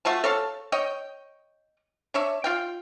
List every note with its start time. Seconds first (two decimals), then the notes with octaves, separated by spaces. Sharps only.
0.05 A3 F4 F#4 A5
0.24 A4 C#5 F5 A5
0.72 C#5 D#5 G5
2.14 D4 C#5 E5
2.44 F4 F5 G5